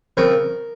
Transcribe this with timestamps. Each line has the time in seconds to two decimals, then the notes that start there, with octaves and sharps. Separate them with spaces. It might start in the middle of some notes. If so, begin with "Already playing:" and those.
0.17 C#3 F3 C4 A#4